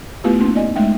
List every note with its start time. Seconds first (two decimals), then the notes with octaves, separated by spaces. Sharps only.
0.24 A3 B3 E4 F4 G4 B4
0.39 A#3 C#4 D#4
0.55 D5 D#5 G#5
0.76 G#3 A3 D#4 E5 G5